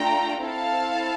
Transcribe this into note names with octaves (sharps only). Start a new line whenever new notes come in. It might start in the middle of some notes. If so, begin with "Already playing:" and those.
Already playing: A3 D4 F4 G5 A#5
C4 E4 A4 F5 A5